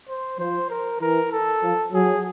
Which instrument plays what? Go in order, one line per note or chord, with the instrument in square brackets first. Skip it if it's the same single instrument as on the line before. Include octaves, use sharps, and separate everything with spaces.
[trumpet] C5
[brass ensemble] F3 [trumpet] C5
[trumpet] A#4
[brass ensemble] E3 [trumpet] A#4
[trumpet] A4
[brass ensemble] F3
[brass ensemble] F#3 [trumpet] G#4